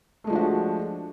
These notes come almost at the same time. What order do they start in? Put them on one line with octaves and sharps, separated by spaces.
A3 G#3 F3 D4 F#4